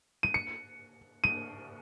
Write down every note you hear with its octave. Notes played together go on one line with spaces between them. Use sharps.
D#7
C#7
D#7